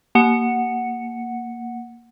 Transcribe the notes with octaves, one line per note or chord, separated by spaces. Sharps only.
A#3 F#5 C#7